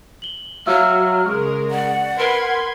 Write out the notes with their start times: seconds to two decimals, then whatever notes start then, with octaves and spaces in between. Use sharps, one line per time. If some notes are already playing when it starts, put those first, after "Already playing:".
0.22 F#7 G7
0.66 F#3 E5 F5 E6 F6
1.26 C#3 G#3 A#4 C#6
1.71 D5 F#5
2.18 A#4 B4 C6 G#6